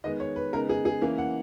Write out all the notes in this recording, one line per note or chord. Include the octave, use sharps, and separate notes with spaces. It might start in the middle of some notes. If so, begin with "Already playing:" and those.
D#3 G#3 B3 D#5
C#5
B4
C#3 G#3 B3 D#4 A#4
G#4
G#4
E3 A#3 C#4
F#5